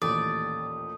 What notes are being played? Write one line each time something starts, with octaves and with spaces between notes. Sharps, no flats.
A1 D#2 A#2 A3 D5 D#6